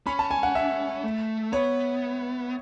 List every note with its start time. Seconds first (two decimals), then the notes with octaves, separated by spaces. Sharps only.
0.06 C#4 B5
0.19 A5
0.31 G#5
0.43 F#5
0.55 E5
1.03 A3
1.52 B3 C#5